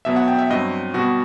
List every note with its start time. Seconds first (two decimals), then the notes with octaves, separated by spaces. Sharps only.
0.05 B2 F#3 B3 E5
0.16 F#5
0.28 G5
0.38 E5
0.50 G2 F#3 C4 D#5
0.94 B2 G3 B3 F#4